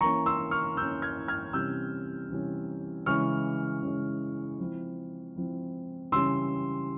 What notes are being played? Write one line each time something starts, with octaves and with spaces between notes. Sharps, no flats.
E3 A#3 C#4 A#5 C#6
C6 E6
C#6 F6
E3 A#3 C#4 E6 G6
F6 G#6
F6 G#6
C3 E3 G3 C#4 E6 G6
C3 E3 G3 C#4
C#3 E3 G#3 C#6 F6
C#3 E3 G#3
F3 C4 E4
F3 C4 E4
C#3 E3 G3 C#4 C6 E6